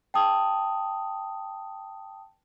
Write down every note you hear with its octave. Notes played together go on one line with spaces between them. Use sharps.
G5 A5 D#6